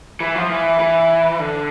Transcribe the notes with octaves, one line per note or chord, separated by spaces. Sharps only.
E3
F3
E3
E3
D3